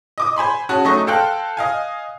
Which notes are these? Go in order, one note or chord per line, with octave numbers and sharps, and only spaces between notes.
D#5 D6 D#6
C5 G#5 B5 C6
C#4 F#4 G#4 A5
F#3 A3 D#4 D#5 C#6 A#6
A4 C5 F5 G5 F#6
D#5 F5 G#5